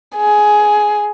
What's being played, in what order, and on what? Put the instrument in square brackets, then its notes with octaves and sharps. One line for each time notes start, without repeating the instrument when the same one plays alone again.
[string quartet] G#4